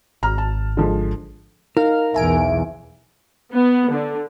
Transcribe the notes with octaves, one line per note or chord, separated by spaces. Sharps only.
G#1 A#5 F6
A5
D3 F3 G#3
D#4 A#4 F5
B1 E2 E5 G#5 D7
B3
D3